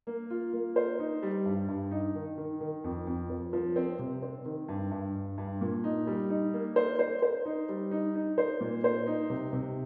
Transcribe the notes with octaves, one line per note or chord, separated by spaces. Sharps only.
A#3
F4
A#3
C5
D#4
G3
G2
G2
D#4
D#3
D#3
D#3
F2
F2
F3
F3
C4
C3
C4
D#3
G2
G2
G2
G2
A#2
D#4
G3
D#4
A#3
C5
C5
C5
D#4
G3
D#4
D#4
C5
A#2
C5
D#4
C3
C3